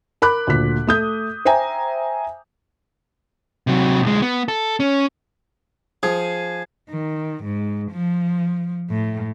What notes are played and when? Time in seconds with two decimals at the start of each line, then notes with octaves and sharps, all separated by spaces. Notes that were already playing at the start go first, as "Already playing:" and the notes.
0.22 A#4 B5 D6 F#6
0.47 D2 A#2 B6
0.87 A3 D#6 G6
1.45 C5 E5 G5 G#5 A#5
3.67 C3 F#3
4.02 B1 G#3
4.22 B3
4.48 A4
4.80 C#4
6.03 F3 G#4
6.90 D#3
7.44 G#2
7.92 F3
8.90 A2